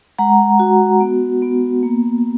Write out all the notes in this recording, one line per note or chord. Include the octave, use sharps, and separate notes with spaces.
G#3 F#5 A#5
F#4
B3
B3
A#3